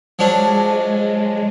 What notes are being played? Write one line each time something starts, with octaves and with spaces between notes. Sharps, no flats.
F3 F#3 G#3 D4